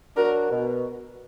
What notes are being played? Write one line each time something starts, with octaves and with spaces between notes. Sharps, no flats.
F#3 D4 F#4 A#4
B2